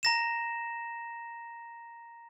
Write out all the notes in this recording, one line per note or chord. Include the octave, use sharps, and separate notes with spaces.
A#5 A#6 E7